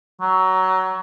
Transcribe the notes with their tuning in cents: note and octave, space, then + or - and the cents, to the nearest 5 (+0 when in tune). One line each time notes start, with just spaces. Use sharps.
F#3 +20